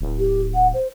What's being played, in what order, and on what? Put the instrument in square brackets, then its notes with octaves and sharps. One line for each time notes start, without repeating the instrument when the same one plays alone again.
[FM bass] D1
[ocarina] G4
F#5
C5